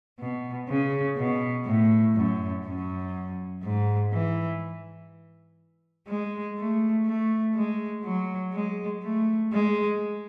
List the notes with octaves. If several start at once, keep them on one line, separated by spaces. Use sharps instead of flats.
B2
C#3
B2
A2
F#2
F#2
G#2
E3
G#3
A3
A3
G#3
F#3
G#3
A3
G#3